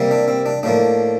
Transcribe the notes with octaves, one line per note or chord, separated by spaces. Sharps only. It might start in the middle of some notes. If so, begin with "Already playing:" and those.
Already playing: C3 G3 A#3
D4
C4
D4
A2 F3 A#3 D4